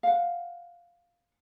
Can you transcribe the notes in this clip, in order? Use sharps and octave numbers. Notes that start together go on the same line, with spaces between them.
F5 F#5